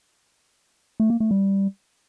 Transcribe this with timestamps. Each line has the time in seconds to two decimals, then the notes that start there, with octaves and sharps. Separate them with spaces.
1.00 A3
1.10 A#3
1.20 A3
1.31 G3